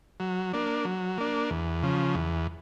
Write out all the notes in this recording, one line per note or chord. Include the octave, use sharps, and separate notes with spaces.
F#3
A#3 D4
F#3
A#3 D4
E2
C#3 F3
E2